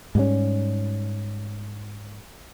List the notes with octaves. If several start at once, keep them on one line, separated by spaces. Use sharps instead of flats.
G#2 G3 A#3 C#4